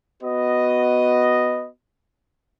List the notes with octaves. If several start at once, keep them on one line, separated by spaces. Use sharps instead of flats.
B3 F#4 B4 D#5